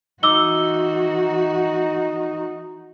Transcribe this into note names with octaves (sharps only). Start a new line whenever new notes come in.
E3 D#4 F#4 D6 E6 G7